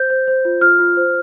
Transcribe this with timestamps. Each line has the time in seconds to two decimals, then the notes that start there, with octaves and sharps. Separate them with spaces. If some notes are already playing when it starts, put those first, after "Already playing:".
Already playing: C5 G6
0.10 C5
0.27 C5
0.45 F4
0.61 F4 F6
0.79 F4
0.97 C5